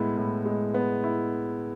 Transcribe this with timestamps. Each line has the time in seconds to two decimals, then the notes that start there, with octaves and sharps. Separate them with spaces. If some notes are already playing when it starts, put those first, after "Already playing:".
Already playing: A2 G#3 B3 E4
0.17 A2
0.46 G#3
0.74 B3
1.04 E4